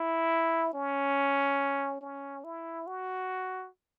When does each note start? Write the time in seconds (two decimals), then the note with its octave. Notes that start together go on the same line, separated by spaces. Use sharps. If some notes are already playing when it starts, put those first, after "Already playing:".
Already playing: E4
0.74 C#4
2.01 C#4
2.44 E4
2.87 F#4